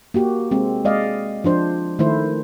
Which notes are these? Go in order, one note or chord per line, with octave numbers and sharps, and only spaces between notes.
A#3 F#4 G4
G#3 C4
G#3 D5 D#5 F5
F3 D4 C5
D#3 A3 E4 C5